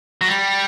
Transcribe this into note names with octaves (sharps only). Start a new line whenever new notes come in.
F#3
G3